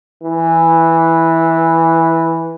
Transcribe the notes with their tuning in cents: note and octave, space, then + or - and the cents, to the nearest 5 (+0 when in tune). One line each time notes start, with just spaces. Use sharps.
E3 -5